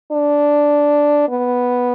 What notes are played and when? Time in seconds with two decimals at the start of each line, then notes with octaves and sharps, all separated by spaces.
0.12 D4
1.29 B3